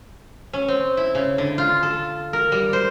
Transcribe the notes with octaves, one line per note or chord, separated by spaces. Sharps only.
C#4
C4
E4
C#3
D3
F4
A4
A#4
G3
C5